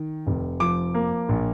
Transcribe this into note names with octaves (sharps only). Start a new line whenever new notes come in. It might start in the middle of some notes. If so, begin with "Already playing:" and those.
Already playing: D#3
F1
F3 D6
A#3
A#1